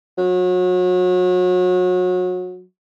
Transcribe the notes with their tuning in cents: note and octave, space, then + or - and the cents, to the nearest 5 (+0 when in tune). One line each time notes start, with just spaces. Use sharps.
F#3 -30